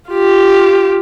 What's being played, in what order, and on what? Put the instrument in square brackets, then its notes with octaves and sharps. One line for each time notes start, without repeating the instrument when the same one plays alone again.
[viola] F4 G4